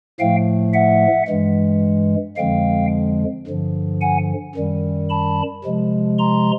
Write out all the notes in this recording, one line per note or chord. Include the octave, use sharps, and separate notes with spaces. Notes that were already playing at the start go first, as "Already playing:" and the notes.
A2 F3 A3 F5 G5
E5 F#5
G2 E3 G#3
F2 D3 F3 G#3 F5 G5
G2 D3 F3
F#5 G#5
F#2 D#3 G3
A5 B5
C3 F3 G#3
A#5 C6